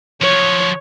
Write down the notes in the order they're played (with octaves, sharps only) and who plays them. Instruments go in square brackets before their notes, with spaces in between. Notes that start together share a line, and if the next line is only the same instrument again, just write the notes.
[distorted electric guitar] F3 F#3 [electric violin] C#5